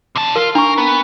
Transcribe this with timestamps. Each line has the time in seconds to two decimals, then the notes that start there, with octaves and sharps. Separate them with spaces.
0.16 C3 A5
0.36 F4 A#4
0.55 D4 A#4 C#6
0.78 B3